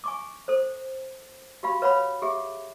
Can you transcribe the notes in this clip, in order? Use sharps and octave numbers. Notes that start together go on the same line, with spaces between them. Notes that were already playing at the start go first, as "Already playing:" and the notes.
G#5 C#6 D6
A4 C5
F#4 G4 F5 B5
B4 C#5 F5 F#5 B5
G4 G#4 E5